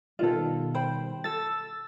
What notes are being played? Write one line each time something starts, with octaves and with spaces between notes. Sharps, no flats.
B2 D#3 G3 F4 A4
C5 G5 B5
A4 E6 A6